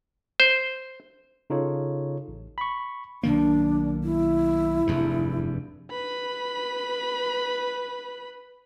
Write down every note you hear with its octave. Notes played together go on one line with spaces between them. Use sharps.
C5
C#3 D#4 F4 A4 C#5
A1
B5 C#6
B1 D#3 A#3 D4
E4
F1 E2 G2
B4 B5